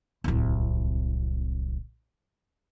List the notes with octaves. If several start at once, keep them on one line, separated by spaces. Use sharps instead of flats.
D1 C2